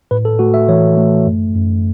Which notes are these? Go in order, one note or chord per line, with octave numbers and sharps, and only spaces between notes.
A2 B4
A4
A3 F#4
E5
E3 C#5
A3
F#2
F#2